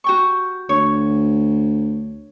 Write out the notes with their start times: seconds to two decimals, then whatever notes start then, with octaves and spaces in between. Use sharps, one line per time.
0.04 F#4 G5 C#6
0.69 D2 C#5